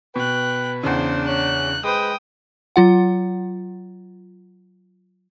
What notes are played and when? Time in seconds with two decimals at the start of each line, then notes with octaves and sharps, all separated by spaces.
0.16 B2 B4 G5 F#6
0.83 E2 C#3 D4 C5
1.28 C#4 F#6
1.84 G#3 B4 C5 G5 D#6
2.76 F#3 F4 F#5